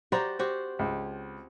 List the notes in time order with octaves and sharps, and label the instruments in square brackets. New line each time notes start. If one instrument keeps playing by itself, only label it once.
[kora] F#4 G4 D5 [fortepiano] C5 A#5
[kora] C4 F#4 G4
[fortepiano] C#2